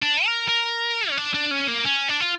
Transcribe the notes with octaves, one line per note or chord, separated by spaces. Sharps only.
D4
A#4
A#4
C#4
D4
D4
C#4
A#3
C#4
D4
F4